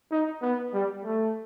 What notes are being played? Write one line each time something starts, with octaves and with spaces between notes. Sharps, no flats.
D#4
B3
G3
A3